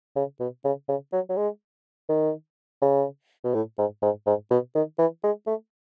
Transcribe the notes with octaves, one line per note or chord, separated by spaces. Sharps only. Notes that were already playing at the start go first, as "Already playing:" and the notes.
C#3
B2
C#3
C#3
F#3
F#3
G#3
D#3
C#3
B2
A2
G#2
G#2
G#2
B2
D#3
E3
G#3
A3